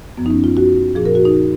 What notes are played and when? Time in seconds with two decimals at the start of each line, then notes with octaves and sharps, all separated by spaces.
0.17 F#2 F3 B3
0.26 D#4
0.31 C#4
0.44 F4
0.57 F#4
0.96 A#2 F3 G#4
1.06 A#4
1.15 F#4
1.25 D#4